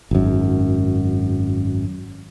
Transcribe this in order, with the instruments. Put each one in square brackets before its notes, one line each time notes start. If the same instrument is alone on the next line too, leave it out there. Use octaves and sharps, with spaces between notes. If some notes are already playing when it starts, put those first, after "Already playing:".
[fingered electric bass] G#1 F#2